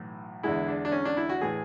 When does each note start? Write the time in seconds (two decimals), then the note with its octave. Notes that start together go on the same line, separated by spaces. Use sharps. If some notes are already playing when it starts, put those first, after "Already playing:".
Already playing: B1 A2 E3
0.43 E2 D3 G#3 E4
0.68 D4
0.85 D4
0.92 C#4
1.05 D4
1.17 E4
1.29 F#4
1.41 A2 E3 G#4